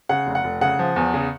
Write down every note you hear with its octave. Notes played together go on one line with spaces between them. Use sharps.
C#3 F#5
F1
F#5
F1
C#3 F#5
F3
E2
C#3